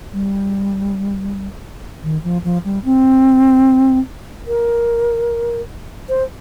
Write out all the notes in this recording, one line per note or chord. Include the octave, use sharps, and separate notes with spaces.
G3
D#3
F3
F3
G3
C4
A#4
C5